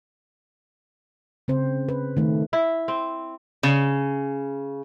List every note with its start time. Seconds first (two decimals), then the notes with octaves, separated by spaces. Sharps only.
1.48 C#3 C4 C5
1.89 B4
2.17 D#3 A3
2.53 E4
2.88 C4
3.63 C#3